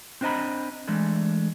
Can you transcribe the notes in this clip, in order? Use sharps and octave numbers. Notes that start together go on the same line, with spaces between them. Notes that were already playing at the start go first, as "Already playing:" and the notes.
C4 D4 C5 D#5 A#5 B5
E3 G#3 A3 D4